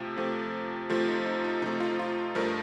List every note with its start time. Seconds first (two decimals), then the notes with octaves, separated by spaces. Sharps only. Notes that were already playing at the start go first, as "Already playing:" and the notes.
Already playing: C3 F3 A3 G4
0.16 C3 F3 A3
0.90 C3 F3 A3 F4
1.08 D#4
1.26 D#4
1.44 D#4
1.62 C3 F3 A3 D#4
1.80 F4
1.99 F4
2.35 G2 F3 A3 A#4